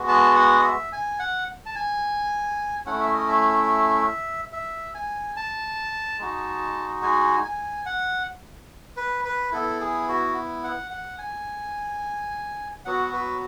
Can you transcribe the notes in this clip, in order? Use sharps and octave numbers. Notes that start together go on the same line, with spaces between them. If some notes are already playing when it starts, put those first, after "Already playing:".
Already playing: G#3 B3 F#4
A5
F#5
D#5
E5
G#5
F#5
A5
G#5
A3 C#4 E4 F#5
E5
D#5
E5
E5
G#5
A5
G#3 D#4 F#4
G#5
G#5
F#5
B4
B4
B3 E4 A4
G#4
F#4
F#5
F#5
G#5
F#3 B3 F#4 F#5
B4